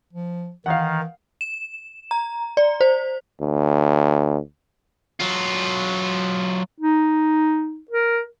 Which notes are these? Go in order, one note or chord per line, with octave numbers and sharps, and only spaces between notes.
F3
D#3 E3 F5 F#5
E7
A#5
D5
C5
D2
F#3 F4
D#4
A#4